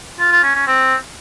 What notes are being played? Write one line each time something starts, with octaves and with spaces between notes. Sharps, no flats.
F4
F4
C#4
C#4
C4